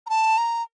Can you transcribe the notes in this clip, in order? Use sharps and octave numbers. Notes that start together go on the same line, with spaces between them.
A#5
A5
A#5